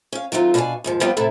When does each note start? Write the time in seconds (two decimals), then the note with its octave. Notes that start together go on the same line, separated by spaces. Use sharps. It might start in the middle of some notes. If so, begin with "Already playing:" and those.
0.13 C#4 F5
0.32 D#3 F#3 A3 C4 D#4 F4
0.54 B2 D4 E4 F#4 F5 G#5
0.84 D#2 G#2 F3
1.00 F3 G3 B3 C4 F4
1.17 A2 C3 E4 A4